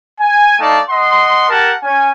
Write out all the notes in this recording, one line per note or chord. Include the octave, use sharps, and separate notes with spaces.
G#5
A3 D#4 D5 F5 A5
D#5 F#5 C6
G4 A#4 F#5 A5
C#4 G#5